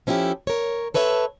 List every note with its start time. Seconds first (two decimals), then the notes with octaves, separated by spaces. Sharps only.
0.07 F3 C#4 E4 F#4 G4 A4
0.47 A#4 C#5
0.94 A4 B4 C#5 E5